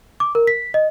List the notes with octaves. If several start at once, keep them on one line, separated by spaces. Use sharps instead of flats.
D6
A#4
B6
D#5